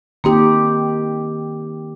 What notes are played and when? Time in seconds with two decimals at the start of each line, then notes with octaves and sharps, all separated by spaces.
0.24 D#3 A#3 C4 D#4 G4